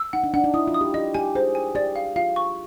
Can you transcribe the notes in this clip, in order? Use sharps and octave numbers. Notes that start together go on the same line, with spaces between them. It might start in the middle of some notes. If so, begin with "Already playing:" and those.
Already playing: E6
D#4 F#5
D4
D4 F#5
D#4
E4 D#6
F4
D#6
G4
G4 D#5
G4 G#5
G#4 C5
G#5
G4 D5
F5
F4 F5
C#6